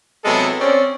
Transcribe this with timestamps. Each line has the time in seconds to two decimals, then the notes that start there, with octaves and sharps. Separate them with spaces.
0.25 C3 F#3 G#3 B3 E4 A4
0.61 C4 C#4 D5